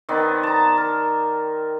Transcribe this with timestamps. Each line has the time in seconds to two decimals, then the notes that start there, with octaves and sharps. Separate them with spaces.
0.09 D#3 B3 C4 D5
0.43 A5 A#5
0.78 A#4